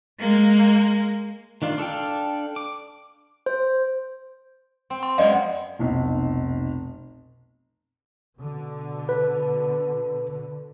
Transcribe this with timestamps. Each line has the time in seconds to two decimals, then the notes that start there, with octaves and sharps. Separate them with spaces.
0.19 G#3 A#3
1.62 D#3 D4 F4
1.78 D4 A4 F5 G5
2.56 D6
3.46 C5
4.90 C4
5.03 C6
5.18 F#2 G#3 B3 D5 D#5 F5
5.79 F1 B1
8.37 B2 D3
9.09 B4